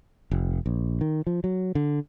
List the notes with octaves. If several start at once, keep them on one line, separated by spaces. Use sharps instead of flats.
F1
A#1
D#3
F3
F#3
D3